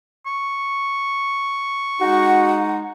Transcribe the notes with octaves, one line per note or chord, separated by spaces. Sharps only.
C#6
G#3 D#4 F#4 F#5